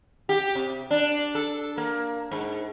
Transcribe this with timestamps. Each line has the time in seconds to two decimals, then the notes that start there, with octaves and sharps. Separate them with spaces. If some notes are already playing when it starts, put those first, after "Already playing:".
0.29 G4
0.55 C3
0.91 D4
1.35 A4
1.78 A#3
2.31 G#2